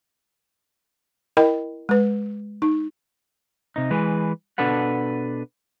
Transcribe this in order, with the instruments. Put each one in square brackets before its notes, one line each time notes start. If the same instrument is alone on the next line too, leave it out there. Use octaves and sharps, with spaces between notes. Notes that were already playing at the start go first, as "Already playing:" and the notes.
[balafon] E4 A#4 D#5 G5 B5
G#3 B4
D#4
[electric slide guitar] C3 D#4
E3 G#3 B4
B2 D4 A4 B4 F#5